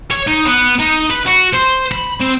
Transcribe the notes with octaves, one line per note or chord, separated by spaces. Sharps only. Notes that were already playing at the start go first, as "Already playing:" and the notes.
C#5
D#4
B3
D#4
B4
F#4
C5
B5
C4